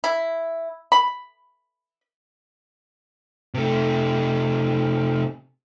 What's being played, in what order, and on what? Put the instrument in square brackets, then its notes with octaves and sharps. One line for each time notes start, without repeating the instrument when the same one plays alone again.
[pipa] E4
B5
[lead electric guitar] C3 A3